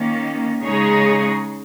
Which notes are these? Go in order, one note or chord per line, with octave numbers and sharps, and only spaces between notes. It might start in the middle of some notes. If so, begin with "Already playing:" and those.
Already playing: D#3 A#3 C#4
C#3 G#3 D#4 G#4 C#5